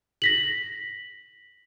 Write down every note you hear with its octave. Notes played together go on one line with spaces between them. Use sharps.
A#6 B6 F#7